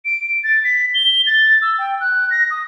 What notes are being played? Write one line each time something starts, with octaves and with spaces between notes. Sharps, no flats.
D7
A6
B6
G7
A6
E6
G5
F#6
A#6
D#6